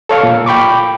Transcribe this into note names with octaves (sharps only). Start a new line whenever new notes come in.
A4 C#5 F5 C#6
A#2
G5 B5 C#6 D6